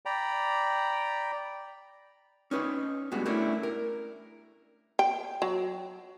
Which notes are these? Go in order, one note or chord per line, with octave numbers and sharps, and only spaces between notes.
D5 G5 A#5 B5
C#4 D#4 B4 C#5
G2 G#3 B3 F#4
A3 C#4 D4 E4 A4 A#4
A#4
G5
F#3